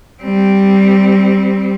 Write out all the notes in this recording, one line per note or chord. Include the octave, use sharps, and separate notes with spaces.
G3 C4